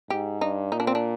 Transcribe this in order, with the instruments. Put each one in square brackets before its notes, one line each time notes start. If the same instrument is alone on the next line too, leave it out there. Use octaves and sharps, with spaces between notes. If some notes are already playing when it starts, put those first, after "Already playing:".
[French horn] G#2 [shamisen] G4
[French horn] G2 [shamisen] D#4
[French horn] A#2 [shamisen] D#4
[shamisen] D4
C4
D4